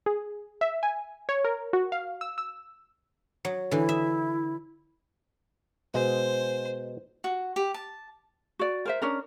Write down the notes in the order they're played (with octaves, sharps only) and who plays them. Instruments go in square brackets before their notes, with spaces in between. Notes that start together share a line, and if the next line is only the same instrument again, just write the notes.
[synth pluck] G#4
E5
G#5
C#5
A#4
F#4
F5
E6
E6
[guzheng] F#3
[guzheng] D3 E3 [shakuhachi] E4
[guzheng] E5
[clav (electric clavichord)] B2 G#3 [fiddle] C5
[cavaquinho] F#4
G4
A5
[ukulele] F#4 D5
A#4 C5 E5
C#4 D4 A#4